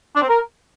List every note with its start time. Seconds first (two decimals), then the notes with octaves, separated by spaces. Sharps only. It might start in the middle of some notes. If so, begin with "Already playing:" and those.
0.16 D4
0.22 C4
0.29 A#4